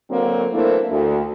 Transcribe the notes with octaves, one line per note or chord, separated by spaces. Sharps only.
D3 F#3 A#3 C4
E3 A3 A#3 C4 D4 E4
D2